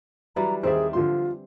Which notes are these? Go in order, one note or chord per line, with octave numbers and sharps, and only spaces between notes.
E3 F#3 G3 D4 A#5
D#2 C4 G#4 C5 D5 E5
D3 F3 F4 C6